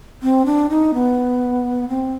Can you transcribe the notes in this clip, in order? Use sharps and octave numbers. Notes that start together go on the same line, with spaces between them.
C4
D4
D#4
B3
C4